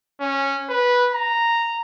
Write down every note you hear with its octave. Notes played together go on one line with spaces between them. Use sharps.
C#4
B4
A#5